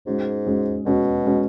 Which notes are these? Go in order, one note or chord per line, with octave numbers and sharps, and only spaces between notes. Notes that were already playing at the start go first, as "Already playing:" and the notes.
G#2 G#3 C#4 F#4
G#3 C#4 F#4
B2 G#3 C#4 F#4
G#3 C#4 F#4